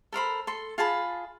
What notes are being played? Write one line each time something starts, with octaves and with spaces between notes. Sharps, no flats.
A4 A#4 C5 B5
A4 C6
F4 G#4 A5 B5